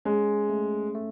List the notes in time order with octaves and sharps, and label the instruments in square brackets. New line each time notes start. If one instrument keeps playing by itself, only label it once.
[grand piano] G#3 [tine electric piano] C#4
[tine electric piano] A3
A3